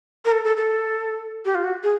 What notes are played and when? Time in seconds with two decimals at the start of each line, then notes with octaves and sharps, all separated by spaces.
0.25 A#4
0.32 A4
0.44 A4
0.57 A4
1.45 G4
1.55 F4
1.64 F#4
1.83 G#4